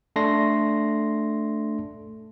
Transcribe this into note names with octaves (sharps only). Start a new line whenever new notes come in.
A3 D4 C6 A#6